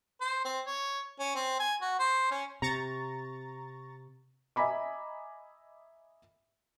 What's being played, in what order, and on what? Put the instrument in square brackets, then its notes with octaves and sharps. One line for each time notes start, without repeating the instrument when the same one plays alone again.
[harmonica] C5
C4
C#5
C#4
C4
G#5
F#4
C5
C#4
[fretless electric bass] C3 [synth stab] A#5 C#6 A6
[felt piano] D#5 E5 G#5 A#5 B5 D6